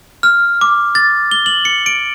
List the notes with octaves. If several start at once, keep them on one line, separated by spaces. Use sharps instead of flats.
F6
D6
A6
G7
F#7
C#7
D7